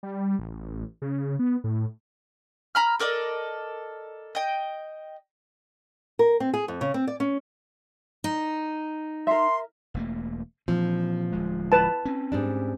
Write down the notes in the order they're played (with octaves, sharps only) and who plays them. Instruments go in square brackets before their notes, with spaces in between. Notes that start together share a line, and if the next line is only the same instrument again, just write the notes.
[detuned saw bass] G3
A1
C#3
B3
A2
[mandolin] A#5 B5 F6
A4 A#4 D5 D#5
D#5 G5
[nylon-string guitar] A#4
C4
G#4
F2
C#3
C4
D5
C#4
[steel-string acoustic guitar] D#4
[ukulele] A#4 E5 [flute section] C6
[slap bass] E1 A3 A#3
[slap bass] A#2 E3 C4 [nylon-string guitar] F3
[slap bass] D1 G#3
[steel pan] B4 A5
[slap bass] C4 C#4
[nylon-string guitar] G#2 G3 D4